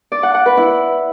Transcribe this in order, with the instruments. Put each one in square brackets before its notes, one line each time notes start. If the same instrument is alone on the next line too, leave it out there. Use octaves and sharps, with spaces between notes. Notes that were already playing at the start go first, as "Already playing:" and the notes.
[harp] D5
F#5
F#5
B4
E4